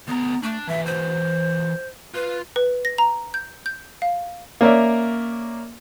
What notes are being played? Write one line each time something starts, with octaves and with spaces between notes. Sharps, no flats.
D2 B3 A#5
A3 D4
E3 F#3 E5
C5
F4 B4
B4
A#6
A#5
G6
G6
F5
A#3 C#4 A#4 D5 E5